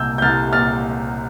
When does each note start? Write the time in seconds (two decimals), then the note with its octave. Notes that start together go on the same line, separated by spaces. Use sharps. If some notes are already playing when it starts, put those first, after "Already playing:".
Already playing: C2 A#2 E6 G6
0.18 G6
0.22 C2 F6 A6
0.53 A#2 F6 A6